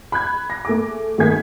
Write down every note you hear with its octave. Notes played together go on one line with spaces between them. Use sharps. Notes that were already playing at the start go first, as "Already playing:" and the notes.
B5 F#6 G#6
A#6
A3 G#4 D6
G#1 D#3 A3 G#4 G#6 B6